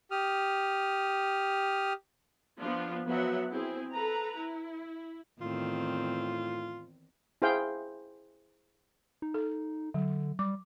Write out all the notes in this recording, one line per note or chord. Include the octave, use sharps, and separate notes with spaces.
G4 D#6 F6
F3 B3 D4 F4
F3 F#3 B3 E5 F#5
C4 E4 G#4
A4 B4 A#5
E4
E2 A2 D#3 C4 F4
E4 G#4 C5 F5 G5
D#4
A4
D3 F#3
G3 D6